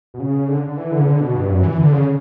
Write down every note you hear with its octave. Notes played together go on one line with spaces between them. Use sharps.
B2
C#3
D3
D3
E3
D3
C#3
D3
B2
G2
F#2
E3
D3
C#3